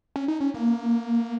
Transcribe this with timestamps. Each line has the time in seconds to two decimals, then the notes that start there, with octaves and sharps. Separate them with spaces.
0.16 C#4
0.28 D#4
0.40 C#4
0.54 A#3